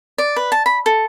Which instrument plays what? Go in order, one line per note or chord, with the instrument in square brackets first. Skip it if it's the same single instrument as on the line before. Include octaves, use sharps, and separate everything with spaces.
[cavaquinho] D5
B4
A5
B5
A4